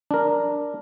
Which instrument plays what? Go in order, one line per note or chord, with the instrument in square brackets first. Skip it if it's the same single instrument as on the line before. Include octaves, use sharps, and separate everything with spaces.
[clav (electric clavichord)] D4 A#4